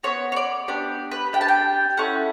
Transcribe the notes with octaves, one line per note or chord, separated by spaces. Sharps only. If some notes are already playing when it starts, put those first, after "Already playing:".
B3 D4 F#4 C#5
C#5
D5
B3 D4 G4 D5
B4
D4 G4 G5
A5
G5
C#4 E4 A4 F#5